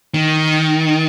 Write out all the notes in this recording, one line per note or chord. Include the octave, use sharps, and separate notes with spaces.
D#3